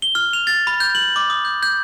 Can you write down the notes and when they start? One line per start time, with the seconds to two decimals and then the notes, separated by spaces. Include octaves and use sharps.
0.02 G7
0.15 F6
0.33 F7
0.47 A6
0.67 B5
0.80 G6
0.95 F#7
1.16 D6
1.30 D#6
1.45 G6
1.63 G6